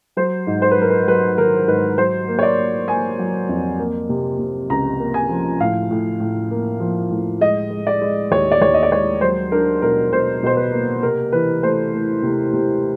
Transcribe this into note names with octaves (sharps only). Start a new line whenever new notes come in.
F#3 C5
G#2
C5
B4
F#3 A#4
B4
F#3 B4
D#3 A#4
G#2 B4
F#3 C5
A#3
C#5
D5
A#3
A#3 G#5
F#3
F2
A#3
C3
C3
C#2 A#5
A#3
G#5
F3
A2 F5
A2
A2
A#3
F3
A2
G#3 D#5
G#3
D5
G#3
D#2 C#5
D5
D#2 C#5
D#5
D5
G#3 C#5
F#3 C5
D4 A#4
B2 A#4
B2 C5
B2 C5
B4
A#3
C3 A#4
E3 B4
A3 C5
A3
C3
C3